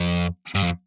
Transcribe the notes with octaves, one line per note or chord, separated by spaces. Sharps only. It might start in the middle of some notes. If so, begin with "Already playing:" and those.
Already playing: F2
G2
F2